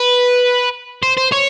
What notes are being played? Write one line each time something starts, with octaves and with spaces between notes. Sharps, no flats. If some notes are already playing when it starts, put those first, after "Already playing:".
Already playing: B4
C5
C5
C#5